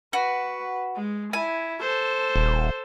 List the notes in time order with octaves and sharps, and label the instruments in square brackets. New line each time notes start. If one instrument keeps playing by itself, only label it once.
[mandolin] F#4 [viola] B4
[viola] G#3
[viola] E4 [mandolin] G#5
[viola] A4 C5
[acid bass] D#1